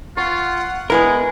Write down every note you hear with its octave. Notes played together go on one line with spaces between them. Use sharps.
F4 F#5 C#6
G#3 B3 E4 A#4 B4 G#5 D#6